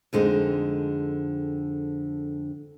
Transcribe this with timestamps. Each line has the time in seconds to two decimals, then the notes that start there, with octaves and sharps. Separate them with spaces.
0.13 F2 D3 G#3 D4 D#4